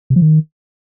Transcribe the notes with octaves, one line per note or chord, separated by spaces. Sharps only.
C3
F3
D#3